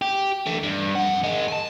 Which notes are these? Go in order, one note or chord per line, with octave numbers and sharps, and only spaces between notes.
G4
D3 E3
G2
F2 F#5
D#3 G#3
G#5 A5